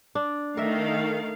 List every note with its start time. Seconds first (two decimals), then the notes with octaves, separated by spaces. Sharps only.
0.15 D4
0.57 D#3 A3 A#4 E5 F5